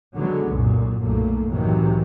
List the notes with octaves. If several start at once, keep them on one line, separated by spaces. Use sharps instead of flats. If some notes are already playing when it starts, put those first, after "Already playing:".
D3 F#3 G#3 B3
C2 F#2 A#2
B1 F#2 A#2 A3 A#3
C2 A2 C3 D#3 E3 F#3